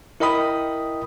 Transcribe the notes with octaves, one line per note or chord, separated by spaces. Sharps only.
E4 A#4 D#5 G5 B5 D#6